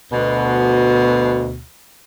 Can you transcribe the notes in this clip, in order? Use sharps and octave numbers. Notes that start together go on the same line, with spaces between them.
D2 B2